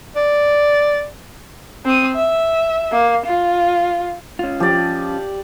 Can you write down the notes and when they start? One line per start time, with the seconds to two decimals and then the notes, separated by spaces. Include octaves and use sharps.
0.16 D5
1.85 C4 D#6
2.15 E5
2.92 A#3
3.26 F4
4.39 C#4 F4
4.60 F3 G4 D5